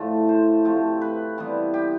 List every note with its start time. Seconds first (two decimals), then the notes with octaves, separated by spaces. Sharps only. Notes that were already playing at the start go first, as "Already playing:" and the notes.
Already playing: A2 F3 A3 A4
0.29 C5
0.65 C3 F3 A3
1.01 B4
1.38 C3 E3 G3 B3
1.74 G4